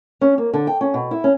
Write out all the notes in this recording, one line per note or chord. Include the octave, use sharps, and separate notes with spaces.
C#4
A#3
D3
G5
C#4
B2
E4
C#4